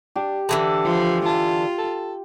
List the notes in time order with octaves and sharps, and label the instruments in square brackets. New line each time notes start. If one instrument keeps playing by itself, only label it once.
[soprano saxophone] D4 [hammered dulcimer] G4
[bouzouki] D3 E3 G#3 [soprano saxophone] A5
[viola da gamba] F3
[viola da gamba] F4 [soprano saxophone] A5
[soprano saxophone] A4